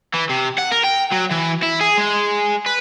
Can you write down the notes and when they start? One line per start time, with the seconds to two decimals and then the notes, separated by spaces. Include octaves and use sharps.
0.14 E3
0.30 C3
0.58 F#5
0.71 A#4
0.84 G5
1.11 F#3
1.31 E3
1.63 E4
1.81 G#4
1.97 G#3
2.66 B4